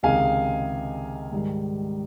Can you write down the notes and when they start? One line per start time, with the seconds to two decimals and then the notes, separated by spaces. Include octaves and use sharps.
0.03 C#2 C3 D#3 G#3 D#4 F5 G#5
1.32 G#2 D#3 G3